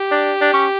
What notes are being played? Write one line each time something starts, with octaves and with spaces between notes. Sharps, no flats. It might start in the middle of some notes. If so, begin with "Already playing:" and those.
Already playing: G4
D4
D4
C#4